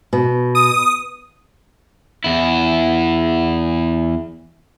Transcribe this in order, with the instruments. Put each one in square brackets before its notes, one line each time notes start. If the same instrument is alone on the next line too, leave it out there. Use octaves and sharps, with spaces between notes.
[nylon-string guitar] B2
[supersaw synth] D#6
[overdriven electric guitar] E2 E4